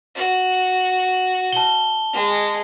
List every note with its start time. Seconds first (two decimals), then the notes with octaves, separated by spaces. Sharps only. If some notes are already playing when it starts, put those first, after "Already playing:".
0.15 F#4
1.53 A5 G7
2.13 G#3